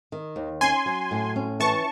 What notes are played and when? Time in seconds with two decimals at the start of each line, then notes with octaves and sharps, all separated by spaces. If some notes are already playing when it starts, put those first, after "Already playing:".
0.12 D#3
0.36 D#2
0.61 C#4 G#5 C6
0.86 F#3
1.11 A2
1.36 C#4
1.60 E3 A5 C#6